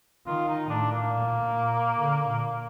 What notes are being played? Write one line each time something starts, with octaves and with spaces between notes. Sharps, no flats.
D#3 F4
D#4
A2 D4
A#3
A#2
A#2
D3
A#2